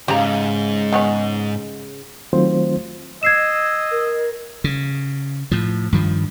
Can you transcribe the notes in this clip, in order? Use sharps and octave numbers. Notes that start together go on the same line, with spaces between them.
D#2 G#2 C#3 G4 D#5 A#5
D#3 B3 C#4
D#3 F#3 A3 C4 F4 C5
D#5 E6 G#6 C7 E7
A#4
C#3
A2 F3
G2 D#3 F3